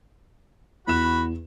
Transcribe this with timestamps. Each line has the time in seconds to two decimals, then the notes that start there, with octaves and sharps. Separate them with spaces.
0.87 E2 F#4 B5 E7